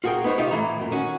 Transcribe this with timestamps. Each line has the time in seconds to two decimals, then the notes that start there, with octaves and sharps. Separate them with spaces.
0.04 F4 F#4 G#4 A#4 G5
0.24 B3 D#4 C5 C#5
0.38 C3 D#4 F4 G4
0.51 A2 E3 A#5
0.78 F#2 A#2
0.91 D#3 C#4 F#4